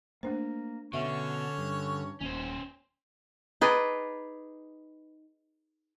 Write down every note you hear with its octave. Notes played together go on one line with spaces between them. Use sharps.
A3 A#3 D4 C5
B2 D3 C#4 C#5 E5
G2
D#1 G#1 D#2 C#4 C5
D#4 G#4 B4 D5